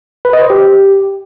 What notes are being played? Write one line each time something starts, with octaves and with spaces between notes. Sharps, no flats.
B4
D#5
C5
G4